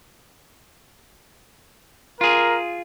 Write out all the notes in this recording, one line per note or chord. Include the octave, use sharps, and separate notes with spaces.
F4 G#4 A#4